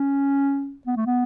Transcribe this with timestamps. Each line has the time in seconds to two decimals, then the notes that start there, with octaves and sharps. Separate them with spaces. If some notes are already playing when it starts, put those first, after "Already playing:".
Already playing: C#4
0.87 B3
0.96 A3
1.06 B3